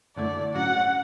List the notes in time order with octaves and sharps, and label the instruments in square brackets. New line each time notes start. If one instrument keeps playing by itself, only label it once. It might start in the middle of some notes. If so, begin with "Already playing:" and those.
[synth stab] F#2 D3 A3 E4 [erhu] D5
[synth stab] G#2 F#3 C#4 F#4 [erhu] F#5